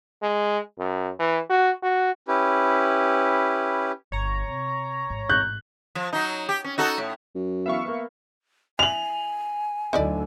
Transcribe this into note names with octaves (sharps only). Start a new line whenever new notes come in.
G#3
F#2
E3
F#4
F#4
C#4 E4 G4 B4
G1 C#5 A#5
C3
A1 G#2
F#6 G6
F3
F#3 D#4
G4
C#4
D#4 F#4 A4
A2
F#2
E3 B3 E5 F5 C#6
A#3 B3
D#3 E3 G#5 F7 F#7
D2 D3 F#3 D#4 E4 D5